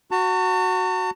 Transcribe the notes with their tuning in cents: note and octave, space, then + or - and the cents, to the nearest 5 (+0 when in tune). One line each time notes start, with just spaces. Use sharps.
F#4 +0 A5 +45